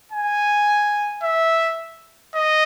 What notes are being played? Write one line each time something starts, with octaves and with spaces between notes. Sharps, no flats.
G#5
E5
D#5